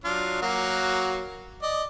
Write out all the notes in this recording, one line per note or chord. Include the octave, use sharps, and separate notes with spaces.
F#3 D4 F4
F#3 A#3 F#4
D5 D#5